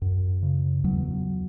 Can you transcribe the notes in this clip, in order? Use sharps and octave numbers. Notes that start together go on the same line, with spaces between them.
F#2
C#3
E2 F#3